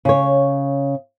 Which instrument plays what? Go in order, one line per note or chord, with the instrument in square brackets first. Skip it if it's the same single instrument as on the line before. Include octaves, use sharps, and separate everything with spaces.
[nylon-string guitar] C#3 C#5